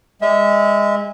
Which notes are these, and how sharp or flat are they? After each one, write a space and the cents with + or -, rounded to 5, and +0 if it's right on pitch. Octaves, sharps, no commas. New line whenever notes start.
G#3 -25 E5 -30